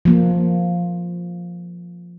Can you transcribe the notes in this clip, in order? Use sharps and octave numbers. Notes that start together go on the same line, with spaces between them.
F3 A#3